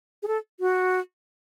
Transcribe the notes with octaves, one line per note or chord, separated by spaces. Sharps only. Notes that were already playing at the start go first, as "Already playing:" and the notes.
G#4
A4
F#4